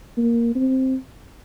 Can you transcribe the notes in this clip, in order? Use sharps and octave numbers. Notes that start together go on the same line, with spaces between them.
A#3
C4